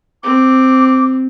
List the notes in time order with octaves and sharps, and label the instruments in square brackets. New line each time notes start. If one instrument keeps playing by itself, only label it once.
[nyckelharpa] C4 [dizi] D6